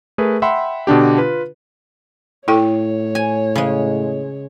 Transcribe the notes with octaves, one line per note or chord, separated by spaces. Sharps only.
A3 G#4 A#4 B4
E5 F#5 G5 B5 C6
B2 D3 D4 G4
F4 B4
A2 E4 A4 C#5 G5
G#5
C#3 G#3